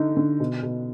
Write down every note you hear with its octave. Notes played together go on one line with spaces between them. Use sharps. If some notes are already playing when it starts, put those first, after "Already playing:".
Already playing: D3 D#4
D3
B2
B2